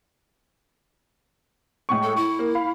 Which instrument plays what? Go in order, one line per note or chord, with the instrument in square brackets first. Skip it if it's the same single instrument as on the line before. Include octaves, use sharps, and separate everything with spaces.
[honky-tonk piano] A2 G#3 C#6
[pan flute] A4
[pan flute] E4 [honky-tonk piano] C#6
[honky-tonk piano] A#3
F5 B5